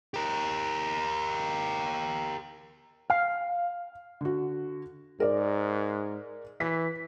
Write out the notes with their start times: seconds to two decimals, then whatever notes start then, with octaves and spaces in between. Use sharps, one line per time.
0.14 G4 A#4
3.10 F5 F6
4.21 D3 F#4
5.20 G#2 A#4 D5
6.60 E3 B6